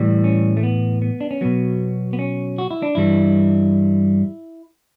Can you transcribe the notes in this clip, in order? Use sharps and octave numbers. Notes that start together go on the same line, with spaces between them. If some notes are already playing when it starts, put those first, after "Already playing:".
Already playing: A2 E3 G3
C#4
A3
B3
B3
D4
C#4
B2 F#3 B3
B3
C#4
F#4
E4
D4
G2 E3 G3 E4